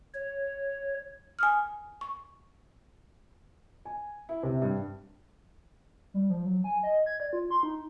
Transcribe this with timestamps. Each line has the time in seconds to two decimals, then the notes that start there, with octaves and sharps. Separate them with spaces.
0.14 C#5
1.39 G#5 D#6 F6
2.01 C#6
3.85 G#5
4.29 E4
4.43 C3
4.62 G2
6.14 G3
6.30 F3
6.45 F#3
6.64 G#5
6.83 D#5
7.06 G#6
7.20 D5
7.33 F4
7.51 C6
7.63 D#4